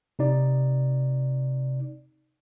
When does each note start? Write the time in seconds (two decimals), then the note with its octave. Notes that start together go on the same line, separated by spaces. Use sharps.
0.19 C3 D#4 D5